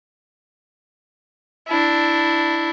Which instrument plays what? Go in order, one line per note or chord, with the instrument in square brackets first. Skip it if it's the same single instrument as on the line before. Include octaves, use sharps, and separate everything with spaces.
[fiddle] D4 E4